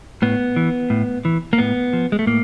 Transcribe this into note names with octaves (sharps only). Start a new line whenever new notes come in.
A2 B3
E3
A2
E3
A#3
A2 B3
F3
G#3
A3
A2 A#3